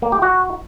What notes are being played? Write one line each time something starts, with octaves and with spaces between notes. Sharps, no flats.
A#3
G4
F#4